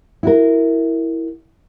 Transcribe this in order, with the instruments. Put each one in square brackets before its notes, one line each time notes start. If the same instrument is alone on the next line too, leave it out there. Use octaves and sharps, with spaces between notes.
[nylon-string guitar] E4 F#4 A#4